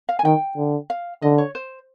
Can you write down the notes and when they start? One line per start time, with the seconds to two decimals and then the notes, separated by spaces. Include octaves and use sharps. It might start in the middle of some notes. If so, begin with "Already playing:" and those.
0.09 F5
0.19 G#5
0.24 D#3 G5
0.57 D3
0.90 F5
1.22 D3 D#5
1.38 C#5
1.55 C5